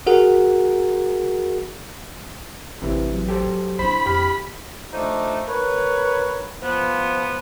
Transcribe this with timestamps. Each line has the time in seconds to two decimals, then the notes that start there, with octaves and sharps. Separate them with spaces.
0.07 F#4 G#4 A#4 F#5
2.82 A1 C3 E3
3.14 F#3
3.29 G4 A4 C5
3.79 D4 E4 C5 B5
4.06 F2 G4 F6
4.93 F3 A3 D4 D#4
5.48 A#4 B4 C#5
6.62 F3 B3